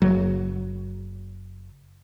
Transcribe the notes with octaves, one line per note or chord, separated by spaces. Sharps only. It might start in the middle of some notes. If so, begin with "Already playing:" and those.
F#1 F#3